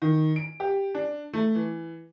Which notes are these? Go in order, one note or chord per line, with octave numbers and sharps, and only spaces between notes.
D#3
D7
G4
D4
A3
E3